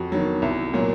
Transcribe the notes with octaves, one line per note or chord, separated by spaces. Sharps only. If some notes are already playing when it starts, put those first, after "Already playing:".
Already playing: F2 F#4
D#3 F#3
C2
A#2 F#3